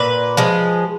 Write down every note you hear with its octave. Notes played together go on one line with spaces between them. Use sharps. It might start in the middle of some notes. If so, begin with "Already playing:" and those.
Already playing: A#2 B4
F3 G#3